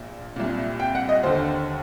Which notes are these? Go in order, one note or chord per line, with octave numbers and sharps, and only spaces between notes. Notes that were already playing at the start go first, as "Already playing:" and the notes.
Already playing: A#1 A#2
C2 A#2
G5
F#5
D#5
D#2 D3 C5